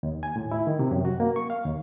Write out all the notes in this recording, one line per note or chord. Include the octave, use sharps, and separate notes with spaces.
D#2
G#5
A2
E4
D#3
C3
F#2
F#4
A#3
C#6
F5
D#2